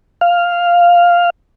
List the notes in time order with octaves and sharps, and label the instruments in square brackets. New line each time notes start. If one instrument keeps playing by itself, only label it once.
[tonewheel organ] F5